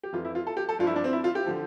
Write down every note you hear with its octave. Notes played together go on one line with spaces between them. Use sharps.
G4
F2 E3 F4
E4
F4
A4
G4
A4
G2 F3 E4 F4
D4
C4
E4
F4
G4
D3 F3